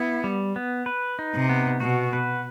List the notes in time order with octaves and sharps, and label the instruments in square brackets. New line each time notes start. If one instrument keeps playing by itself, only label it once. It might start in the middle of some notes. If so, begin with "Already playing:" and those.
Already playing: [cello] B3 [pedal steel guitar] E4
[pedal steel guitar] G3
B3
B4
D#4
[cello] C3
[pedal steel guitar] B3
[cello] B2 [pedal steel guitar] F#4
[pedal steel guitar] B4